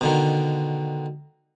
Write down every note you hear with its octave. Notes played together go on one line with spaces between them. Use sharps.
B2 D3 D#3